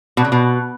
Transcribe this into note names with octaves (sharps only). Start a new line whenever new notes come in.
B2
C#3
B2